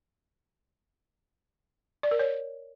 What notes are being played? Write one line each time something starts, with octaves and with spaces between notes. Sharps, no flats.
D5
A#4
C#5